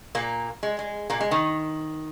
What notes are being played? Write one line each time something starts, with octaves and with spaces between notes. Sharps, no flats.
A#2 A#3
G#3
G#3
A#2 A#3
G#3
D#3